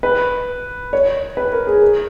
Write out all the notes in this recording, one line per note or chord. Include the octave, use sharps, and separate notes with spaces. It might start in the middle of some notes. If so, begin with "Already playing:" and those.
B4
C#5
B4
A#4
G#4
A#4